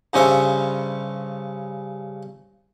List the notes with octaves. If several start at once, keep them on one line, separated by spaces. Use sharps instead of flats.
G2 C#3 C#4 C5 E5